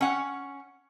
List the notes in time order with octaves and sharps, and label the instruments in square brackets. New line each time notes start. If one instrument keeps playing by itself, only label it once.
[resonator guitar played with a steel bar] C#4 F#5